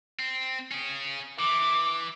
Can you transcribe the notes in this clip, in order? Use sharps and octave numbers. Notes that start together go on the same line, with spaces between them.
C4
C#4 G#4
E3 D6